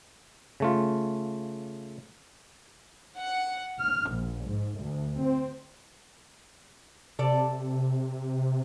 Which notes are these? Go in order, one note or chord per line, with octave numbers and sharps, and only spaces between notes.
C#3 A3 F4
F#5
F6
A#1
G#2
D2
C4
C3 A4 D5